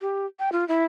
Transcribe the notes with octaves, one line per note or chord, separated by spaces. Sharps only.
G4
G5
F4
E4